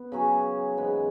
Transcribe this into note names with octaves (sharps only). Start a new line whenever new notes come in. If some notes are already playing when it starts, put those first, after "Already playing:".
Already playing: B3 B4
C#3 F#3 C#4 G#4
G#2 E3 G#3 B3